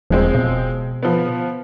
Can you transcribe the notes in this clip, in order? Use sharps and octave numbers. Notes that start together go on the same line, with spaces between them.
E1 F3 G#3 C4
B2
F3 B3